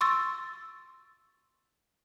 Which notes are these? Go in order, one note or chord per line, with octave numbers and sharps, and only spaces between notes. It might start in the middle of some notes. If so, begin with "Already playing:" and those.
C6 C#6 E6 A6